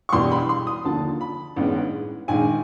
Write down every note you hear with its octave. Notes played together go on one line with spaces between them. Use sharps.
C#6
E1 E2 B2 G3 C6
B5
C6
D#6
D#2 D3 F3 A#3 A5
B5
A1 G2 D#3 G#3 B3
A#1 G#2 D#3 G#3 G#5